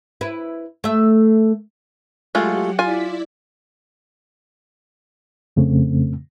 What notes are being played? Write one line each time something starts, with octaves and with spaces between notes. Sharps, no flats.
E4 B4
A3 E5
F#3 G#3 A3 F4 G4 F#5
E4 F4 D5 G#5 B6
F2 C#3 A3 C4